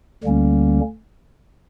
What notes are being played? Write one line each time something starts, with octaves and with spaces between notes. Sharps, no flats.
D2 D3 G3 A#3 C#4